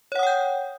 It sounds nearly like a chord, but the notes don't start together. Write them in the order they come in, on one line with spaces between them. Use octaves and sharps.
C#5 F#5 D#6 G5 G6